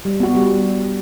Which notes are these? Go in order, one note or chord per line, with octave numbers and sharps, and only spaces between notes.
G3
B3 F#4
G3